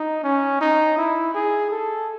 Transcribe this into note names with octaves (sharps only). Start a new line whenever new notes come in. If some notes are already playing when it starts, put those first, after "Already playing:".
Already playing: D#4
C#4
D#4
E4
G#4
A4